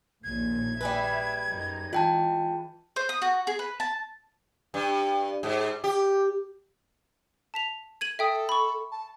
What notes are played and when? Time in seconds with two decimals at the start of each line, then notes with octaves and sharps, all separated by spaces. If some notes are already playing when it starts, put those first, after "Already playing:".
0.24 A#1 D#2 A#2 G#6
0.81 G3 G#4 B4 E5
1.48 F#2 D#4
1.93 E3 G#3 F4 G5 A5
2.96 C5
3.09 D#6
3.22 F#4
3.47 G#4
3.59 B4
3.80 A5
4.74 G2
5.43 G#2
5.84 G4
7.54 A5 B6 F7
8.01 G#6 D#7 F#7
8.19 A4 E5 G5 D#6
8.49 B5 C#6
8.92 A5